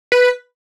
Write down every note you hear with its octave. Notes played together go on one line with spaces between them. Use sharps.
B4